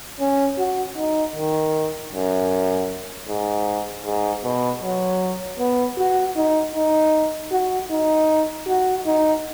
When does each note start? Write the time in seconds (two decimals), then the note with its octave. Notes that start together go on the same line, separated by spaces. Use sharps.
0.20 C#4
0.59 F#4
0.97 D#4
1.36 D#3
2.12 F#2
3.28 G#2
4.05 G#2
4.44 B2
4.83 F#3
5.59 B3
5.98 F#4
6.37 D#4
6.75 D#4
7.53 F#4
7.91 D#4
8.69 F#4
9.07 D#4